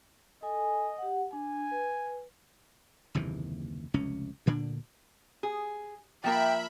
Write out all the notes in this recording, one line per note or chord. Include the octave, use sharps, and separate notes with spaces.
A4 D#5 G#5
G4 F#5
D4 G#5
B4
F#1 D#2 C3 E3
F1 C#2 C#4
D2 A#2 D3 D4
G#4
F3 A#3 A#4 E5 G5 B5